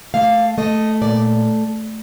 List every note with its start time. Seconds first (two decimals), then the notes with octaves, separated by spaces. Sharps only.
0.14 A3 F5
0.58 A3 D#5
1.01 A#2 D5